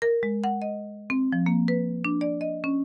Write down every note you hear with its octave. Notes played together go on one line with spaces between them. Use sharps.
A#4
G#3
F#5
D#5
C4
F3
A#3
B4
D4
D5
D#5
C#4